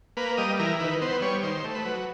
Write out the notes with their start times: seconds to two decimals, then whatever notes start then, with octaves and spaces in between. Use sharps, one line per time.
0.17 A#3 B4
0.38 G3 D#5
0.59 E3 A#4
0.80 D#3 B4
1.01 B3 C5
1.22 G3 C#5
1.43 D#3 C5
1.64 A3
1.75 B4
1.85 F#3